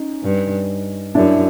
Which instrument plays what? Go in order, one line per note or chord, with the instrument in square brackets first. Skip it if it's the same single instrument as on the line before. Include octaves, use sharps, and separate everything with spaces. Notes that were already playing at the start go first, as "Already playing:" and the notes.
Already playing: [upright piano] C#4 D#4
[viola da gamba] G2
[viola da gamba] F#2 [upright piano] D4 E4